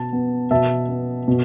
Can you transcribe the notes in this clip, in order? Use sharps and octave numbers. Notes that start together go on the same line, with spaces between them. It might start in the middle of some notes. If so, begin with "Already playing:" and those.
Already playing: B2 A5
B3
B2 E5 A5
B3
B2